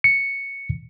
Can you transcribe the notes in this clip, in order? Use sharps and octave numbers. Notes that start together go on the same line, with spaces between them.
C#7